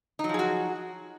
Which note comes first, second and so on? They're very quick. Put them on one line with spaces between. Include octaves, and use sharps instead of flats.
D#4 F#3 F3 G#4 F#4